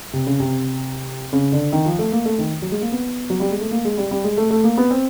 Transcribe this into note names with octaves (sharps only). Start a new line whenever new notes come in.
C3
C#3
C3
C#3
D3
D#3
F3
A3
A#3
A3
D#3
F#3
G#3
A#3
B3
F#3
G3
G#3
A3
A#3
G#3
G3
G3
G#3
A3
A3
A#3
B3
C4